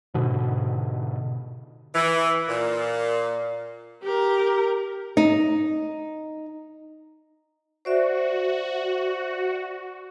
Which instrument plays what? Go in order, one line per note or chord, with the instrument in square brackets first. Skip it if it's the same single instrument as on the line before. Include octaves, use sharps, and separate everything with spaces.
[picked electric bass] G#2 B2 D3
[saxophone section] E3
A#2
[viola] G4 A#4
[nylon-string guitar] D#4
[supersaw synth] F#4 [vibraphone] C5 D5 E5